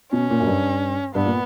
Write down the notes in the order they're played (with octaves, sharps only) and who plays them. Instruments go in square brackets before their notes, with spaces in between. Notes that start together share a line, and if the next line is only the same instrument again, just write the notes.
[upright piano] B2 [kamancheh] C#4
[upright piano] A#2
F#2
G2
[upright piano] G2 [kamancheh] B3
[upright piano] A#2